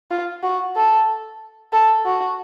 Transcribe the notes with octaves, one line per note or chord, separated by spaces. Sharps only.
F4
F#4
A4
A4
F#4